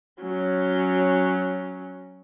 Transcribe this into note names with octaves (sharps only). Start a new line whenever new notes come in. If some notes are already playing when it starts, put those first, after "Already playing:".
F#3 C#4